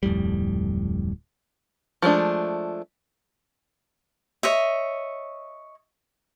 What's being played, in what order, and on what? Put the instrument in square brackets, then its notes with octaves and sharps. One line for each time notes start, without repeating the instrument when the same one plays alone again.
[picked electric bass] D1 F2 A2 G3
[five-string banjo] F3 G#3 A3 D4
[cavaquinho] C#5 D#5 E5